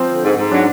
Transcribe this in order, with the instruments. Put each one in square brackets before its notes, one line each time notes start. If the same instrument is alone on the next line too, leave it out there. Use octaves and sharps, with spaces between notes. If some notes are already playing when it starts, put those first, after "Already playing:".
Already playing: [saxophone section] F3 [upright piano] C4
[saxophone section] D3
G#2
G#2
[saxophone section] F#3 [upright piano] D4